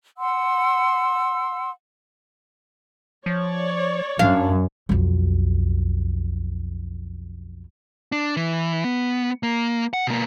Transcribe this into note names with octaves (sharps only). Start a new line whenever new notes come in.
F#5 C6 E6
F3 C#5 D5
F#2 D4 F5
B1 F2
D4
E3
B3
A#3
F#5
B2 A#3